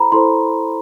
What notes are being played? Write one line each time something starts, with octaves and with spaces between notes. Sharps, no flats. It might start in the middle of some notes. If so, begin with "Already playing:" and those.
Already playing: E4 A4 C5 A#5 B5
E4 A4 C5 C6